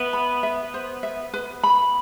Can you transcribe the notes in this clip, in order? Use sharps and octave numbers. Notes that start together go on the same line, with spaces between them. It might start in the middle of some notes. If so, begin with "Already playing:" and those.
Already playing: B3 E5
B5
E5
C5
E5
B4
B5